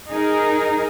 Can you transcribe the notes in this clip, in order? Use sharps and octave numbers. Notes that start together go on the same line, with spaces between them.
D#4 G#4 A#4